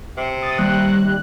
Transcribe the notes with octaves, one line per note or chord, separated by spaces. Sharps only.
C3
D#6 A6
D#2 G3 F#6